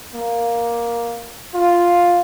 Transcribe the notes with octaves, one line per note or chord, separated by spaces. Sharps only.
A#3
F4